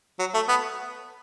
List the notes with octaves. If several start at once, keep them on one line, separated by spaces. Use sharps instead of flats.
F#3
A3
B3